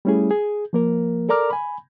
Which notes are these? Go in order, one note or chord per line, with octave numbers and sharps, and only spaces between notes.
G3 A3 C#4 E4 G#4
G#4
F3 A#3 A#4
A4 A#4 D5 A#5 D6 F6
G#5 B5